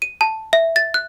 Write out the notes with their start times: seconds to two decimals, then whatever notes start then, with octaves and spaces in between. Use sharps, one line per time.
0.02 D#7
0.21 A5
0.53 E5
0.76 A6
0.94 F#6